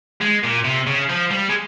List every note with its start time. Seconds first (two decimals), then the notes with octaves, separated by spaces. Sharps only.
0.21 G#3
0.44 A#2
0.65 C3
0.87 C#3
1.10 F3
1.31 G3
1.49 G#3